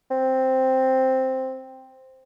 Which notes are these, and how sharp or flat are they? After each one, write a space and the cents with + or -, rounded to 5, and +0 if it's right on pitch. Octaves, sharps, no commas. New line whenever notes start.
C4 +0